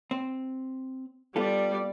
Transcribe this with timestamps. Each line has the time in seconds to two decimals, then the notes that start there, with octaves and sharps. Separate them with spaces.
0.11 C4
1.36 G3 B3 F4 A4 D5